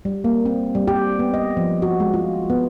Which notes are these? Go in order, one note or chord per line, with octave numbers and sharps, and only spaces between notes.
G3
A#3
C4
G3
G4
B3
D#5
F3
F#4
G#3
F4
B3